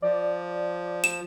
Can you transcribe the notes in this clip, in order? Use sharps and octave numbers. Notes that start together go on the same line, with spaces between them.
F3 D5
E7